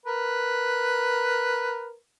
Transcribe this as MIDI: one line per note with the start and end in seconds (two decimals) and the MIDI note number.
0.06 1.94 70
0.06 1.94 71